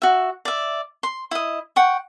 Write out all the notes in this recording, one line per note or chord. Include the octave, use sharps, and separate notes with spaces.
F#4 E5
D5 E5
C6
E4 D#5
F#5 G5 C#6